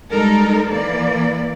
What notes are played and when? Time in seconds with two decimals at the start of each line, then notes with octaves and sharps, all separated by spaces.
0.12 G3 G#3 D#4 A4 A#4
0.74 E3 A#3 D5